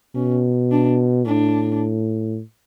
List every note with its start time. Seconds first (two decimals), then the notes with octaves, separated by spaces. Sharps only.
0.15 B2 C#4
0.72 D4
1.26 A2 D4